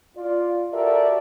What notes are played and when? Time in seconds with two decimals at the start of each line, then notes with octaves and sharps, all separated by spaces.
0.17 F4 D5
0.73 F#4 G4 A4 A#4 D5 E5